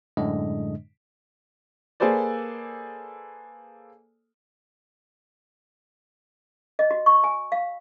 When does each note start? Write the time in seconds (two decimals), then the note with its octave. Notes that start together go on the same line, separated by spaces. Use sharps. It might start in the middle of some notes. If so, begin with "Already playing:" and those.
0.17 F#2 A2 D3 G#3 D4 D#5
2.00 A#3 G#4 A4 B4 C5 D5
6.79 D#5
6.91 F#4
7.06 C#6
7.24 G#5
7.52 F5